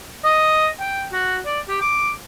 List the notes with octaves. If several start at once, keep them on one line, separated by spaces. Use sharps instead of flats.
D#5
G5
F#4
D5
G4
D6